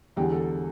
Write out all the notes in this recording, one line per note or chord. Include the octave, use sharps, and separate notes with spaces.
E1 E2 D3 G3 G4
A4